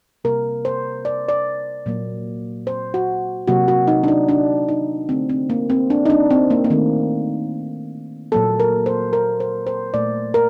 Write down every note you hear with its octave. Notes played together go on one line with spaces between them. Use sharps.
C3 G3 A#3 A#4
C5
D5
D5
A#2 F#3 A#3
C5
F#4
C3 F#3 A#3 F#4
F#4
D#4
D4
D#4
D4
D#4
D3 A3 C4
C4
A#3
C4
D4
D#4
D4
C4
A#3
A#3
D#3 A3 C4
A#2 F#3 A#3 A4
A#4
C5
A#4
C5
C5
A#2 A3 D5
A#4